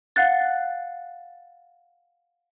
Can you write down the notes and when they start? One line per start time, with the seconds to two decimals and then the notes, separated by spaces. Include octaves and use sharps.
0.16 F5 F#5 F#6 A6